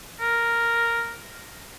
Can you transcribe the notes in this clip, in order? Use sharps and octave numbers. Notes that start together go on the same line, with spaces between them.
A#4